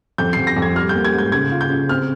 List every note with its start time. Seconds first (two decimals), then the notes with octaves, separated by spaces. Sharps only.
0.18 F2 G6
0.33 C7
0.37 F2
0.47 A#6
0.57 F2
0.62 G#6
0.76 G3 F6
0.89 G6
0.95 A#3
1.04 G#6
1.14 G#2 G6
1.32 C#3 G#6
1.52 F4
1.61 G6
1.70 C#3
1.89 C4 F6